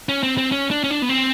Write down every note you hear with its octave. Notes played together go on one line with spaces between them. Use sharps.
C#4
C4
C4
C#4
D4
C#4
D4
B3
C4